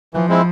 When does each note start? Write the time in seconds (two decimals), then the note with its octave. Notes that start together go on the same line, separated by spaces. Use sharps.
0.14 E3 F3
0.29 G#3 C4 E4